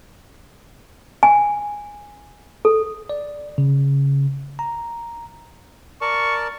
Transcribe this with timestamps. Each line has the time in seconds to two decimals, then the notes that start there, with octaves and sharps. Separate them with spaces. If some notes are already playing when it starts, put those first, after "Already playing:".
1.23 G#5
2.65 A4
3.09 D5
3.58 C#3
4.59 A#5
6.01 A#4 D5 A5 C#6